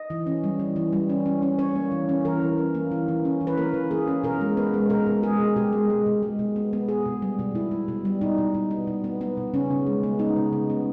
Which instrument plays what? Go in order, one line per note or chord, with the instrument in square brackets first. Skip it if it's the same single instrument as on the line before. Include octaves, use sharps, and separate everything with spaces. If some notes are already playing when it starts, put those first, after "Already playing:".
Already playing: [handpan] D#5
E3
C#4
G3
E3
E3
G3
C#4
C#4
C#4
C#4 C#5
A#3
E3
C#4
E3 A#4
E3
C#4
A#3
E3
E3
C#4
E3
B4
A#3 A#4
E3
A#3 G#4
C#4
B2 A#4
G#3
B3 B4
G#3
B2 A#4
B2
G#3 G#4
B2
B2 G4
G#3
G#3
B2
G#3
B2
B3
B3
B3 G#4
B2
G3
B2
B2 E4
B2
B2
G3
B2 D#4
B2
B2
B3
B2
B3
B3
B2
C#3 C#4
C#3
G#3
B3
B3 D#4
C#3
C#3
B3